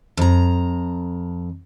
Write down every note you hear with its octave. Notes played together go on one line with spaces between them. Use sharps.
F2 A#5